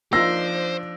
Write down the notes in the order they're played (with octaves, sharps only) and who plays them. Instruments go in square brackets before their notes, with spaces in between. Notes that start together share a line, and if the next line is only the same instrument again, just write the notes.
[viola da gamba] F3 D4 [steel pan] A#3 D#4 F4 [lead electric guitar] C5 [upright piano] E6 A#6